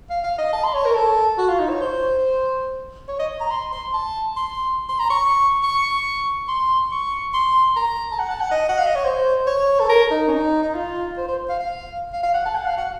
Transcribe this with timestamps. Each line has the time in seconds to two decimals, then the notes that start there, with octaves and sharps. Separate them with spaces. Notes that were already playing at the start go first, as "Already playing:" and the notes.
0.10 F5
0.24 F5
0.38 D#5
0.53 A5
0.64 C6
0.74 C#5
0.85 A#4
0.95 A4
1.38 F#4
1.49 F4
1.60 D#4
1.70 C#5
1.81 C5
3.08 C#5
3.19 D#5
3.41 A#5
3.51 C6
3.72 C6
3.94 A5
4.37 C6
4.89 C6
5.00 A#5
5.10 C#6
5.64 C#6
6.48 C6
6.92 C#6
7.34 C6
7.76 A#5
8.12 A5
8.19 F#5
8.31 A5
8.41 F#5
8.51 D#5
8.69 F#5
8.78 F5
8.87 D#5
8.96 C#5
9.05 C5
9.47 C#5
9.80 A4
9.89 A#4
10.11 D#4
10.28 C#4
10.33 D#4
10.63 D#4
10.75 F4
11.18 C5
11.28 C5
11.49 F5
11.60 F5
12.13 F5
12.23 F5
12.34 F#5
12.46 A5
12.56 F#5
12.66 F5
12.77 F#5